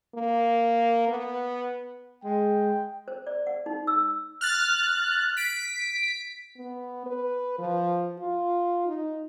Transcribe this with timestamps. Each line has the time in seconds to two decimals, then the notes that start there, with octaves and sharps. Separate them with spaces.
0.15 A#3
1.08 B3
2.24 G#3 G5
3.08 C5
3.27 D5
3.47 F#5
3.66 D#4
3.87 E6
4.41 F6 F#6 A6
5.37 B6 D7
6.58 B3
7.06 B4
7.59 F3
8.19 F4
8.87 D#4